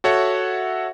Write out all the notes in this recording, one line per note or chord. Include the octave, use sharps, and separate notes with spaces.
F#4 A4 C#5 E5 F#5